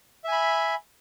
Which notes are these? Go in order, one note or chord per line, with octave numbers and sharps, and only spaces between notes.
E5 G#5 B5